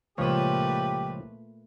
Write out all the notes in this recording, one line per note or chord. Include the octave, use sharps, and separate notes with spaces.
C#2 A#2 F3 A3 G4 B4 C#5